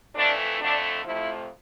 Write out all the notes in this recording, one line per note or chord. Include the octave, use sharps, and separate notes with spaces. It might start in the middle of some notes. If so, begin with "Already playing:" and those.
F2 E3 A3 D4
F2 D3 A3 D4
F2 C3 F3 A3 E4